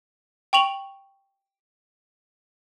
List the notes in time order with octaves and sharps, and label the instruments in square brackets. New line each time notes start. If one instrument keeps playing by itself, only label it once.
[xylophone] G5 C#6 F7 F#7